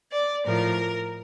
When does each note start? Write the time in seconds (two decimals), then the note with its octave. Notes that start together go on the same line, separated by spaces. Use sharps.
0.11 D5
0.46 A2 F3 A#4